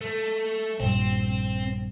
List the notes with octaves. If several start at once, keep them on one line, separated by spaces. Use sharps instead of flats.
A3
A#1 G2 C4